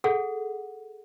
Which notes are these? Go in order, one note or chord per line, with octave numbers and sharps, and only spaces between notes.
G#4 A4 F#5